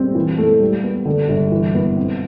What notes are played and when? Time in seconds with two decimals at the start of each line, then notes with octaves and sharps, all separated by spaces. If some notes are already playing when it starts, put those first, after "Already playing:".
Already playing: G3 C4
0.15 E3
0.38 A3
0.60 G3
0.83 B3
1.05 D3
1.29 G1
1.52 E3
1.74 B3
1.97 C4